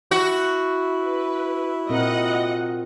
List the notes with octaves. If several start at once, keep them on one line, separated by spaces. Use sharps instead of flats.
E4 F#4
B4
A#2 C4 A#4 D#5 F#5